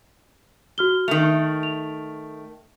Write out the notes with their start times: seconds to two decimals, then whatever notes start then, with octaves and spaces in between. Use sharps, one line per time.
0.78 F#4 F6 G7
1.08 D#3 A3 F7
1.63 F7